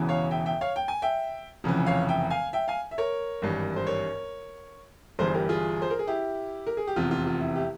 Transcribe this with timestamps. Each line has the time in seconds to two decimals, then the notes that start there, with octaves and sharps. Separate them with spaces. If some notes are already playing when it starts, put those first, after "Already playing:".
Already playing: E1 E2 C#3 E3
0.09 C#5 F5
0.31 E5 G5
0.46 E5 G5
0.61 C#5 F5
0.76 G5
0.88 G#5
1.02 E5 G5
1.64 F1 F2 C#3 E3
1.86 C#5 F5
2.08 E5 G5
2.30 F5 G#5
2.53 E5 G5
2.68 F5 G#5
2.91 E5
2.98 A#4 C#5
3.42 G#1 G2 E3
3.76 C5
3.87 A#4 C#5
5.19 G1 G2 E3 G#4 C5
5.34 G4 A#4
5.49 F4 G#4
5.82 C5
5.90 A#4
5.99 G#4
6.08 E4 G4
6.67 A#4
6.77 G#4
6.87 G4
6.96 F1 E2 C3 F4
7.11 F4
7.27 F4
7.41 E4
7.55 E4 G4